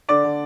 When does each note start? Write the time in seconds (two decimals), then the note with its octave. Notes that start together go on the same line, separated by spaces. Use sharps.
0.09 D3 D5 D6
0.24 D3